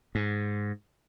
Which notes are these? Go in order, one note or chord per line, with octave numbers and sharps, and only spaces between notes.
G#2